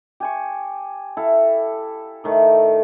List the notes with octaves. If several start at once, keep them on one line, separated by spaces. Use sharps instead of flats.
G4 G#5 C#6
E4 A4 F5
A2 D#3 A3